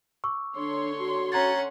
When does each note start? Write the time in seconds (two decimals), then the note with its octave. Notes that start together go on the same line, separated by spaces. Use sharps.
0.24 C#6 D6 E6
0.57 D3 D4 C#5 C6
0.99 F#4
1.32 C#4 F#5 A#5 G#6 A6